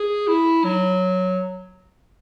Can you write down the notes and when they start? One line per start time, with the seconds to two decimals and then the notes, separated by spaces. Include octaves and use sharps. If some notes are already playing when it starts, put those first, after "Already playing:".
Already playing: G#4
0.27 E4
0.65 F#3